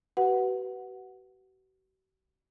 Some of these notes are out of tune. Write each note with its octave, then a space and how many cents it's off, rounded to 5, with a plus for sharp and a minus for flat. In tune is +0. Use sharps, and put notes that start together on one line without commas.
F#4 +45 B4 +0 F#5 +0